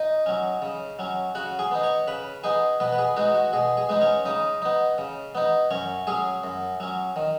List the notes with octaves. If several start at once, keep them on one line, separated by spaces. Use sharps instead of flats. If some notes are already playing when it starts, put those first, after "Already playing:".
Already playing: D#4 D#5
F#3 C#4
C#3
F#3 C#4
C#3 F#4 F#5
G#4 G#5
B3 D#4
C#5 C#6
C#3 B4 B5
B3 D#4 G#4 G#5
B2 B3 B4
B4
G#4
G#3 B3 D#4 F#4
F#4
B2 G#4
G#4
G#3 B3 D#4
C#4 C#5
C#3 D#4 D#5
B3 D#4
C#3
B3 D#4
F#2 C#4 C#5
F#3 C#4 G#4
F#2
F#3 C#4
D#3